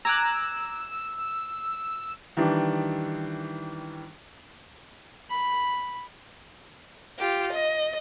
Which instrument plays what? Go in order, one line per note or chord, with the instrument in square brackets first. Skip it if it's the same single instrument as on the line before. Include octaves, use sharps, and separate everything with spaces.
[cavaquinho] G#5 [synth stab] A#5 D6 F#6 [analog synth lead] E6
[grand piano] D#3 E3 G3 D4
[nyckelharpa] B5
[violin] F4 G4
D#5